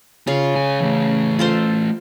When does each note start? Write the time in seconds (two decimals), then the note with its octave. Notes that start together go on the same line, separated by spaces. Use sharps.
0.27 C#3 F4
0.54 C#2 G#5
0.80 E3 A3
1.39 F4 A4 C5